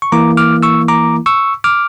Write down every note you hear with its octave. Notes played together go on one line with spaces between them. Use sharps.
C#6
E3 A#3 E4 A#5 D6
D6 F6
C#6 E6
A#5 D6
C#6 E6
D6 F6